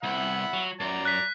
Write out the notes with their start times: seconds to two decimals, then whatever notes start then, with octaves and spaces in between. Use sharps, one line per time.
0.03 C2 E5 F#5 B5
0.53 F#3
0.80 F#2 D5 A#5
1.05 F#6 B6